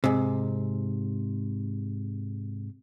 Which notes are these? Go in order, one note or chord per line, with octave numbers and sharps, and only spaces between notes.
G#2 C3